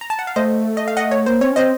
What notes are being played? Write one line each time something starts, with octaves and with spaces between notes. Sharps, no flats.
A#5
A5
F#5
F5
A3 C5 D#5
D#5
F5
D#5 F#5
C#5
A#3 C5
C4 C#5
C#4
C4 C5 D#5